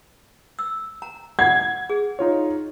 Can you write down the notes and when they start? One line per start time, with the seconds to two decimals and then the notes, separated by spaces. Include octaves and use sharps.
0.59 E6
1.02 A#5
1.39 F#5 G#6
1.90 G#4
2.19 D#4 F4 C#5